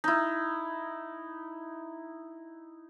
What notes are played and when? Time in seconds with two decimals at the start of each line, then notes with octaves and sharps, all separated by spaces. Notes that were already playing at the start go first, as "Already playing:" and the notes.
0.04 D#4 E4